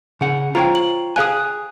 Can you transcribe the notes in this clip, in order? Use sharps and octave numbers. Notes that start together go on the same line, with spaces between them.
C#3 F#5
F4 C5 C#5 G5 A#5
F#7
G#4 F5 G#5 D#6 F#6